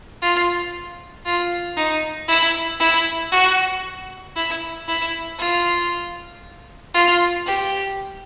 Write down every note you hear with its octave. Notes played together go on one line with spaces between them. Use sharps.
F4
F4
D#4
E4
E4
F#4
E4
E4
F4
F4
G4